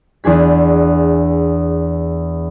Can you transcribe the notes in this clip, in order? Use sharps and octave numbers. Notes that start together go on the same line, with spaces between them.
E2 D4 G#4 B6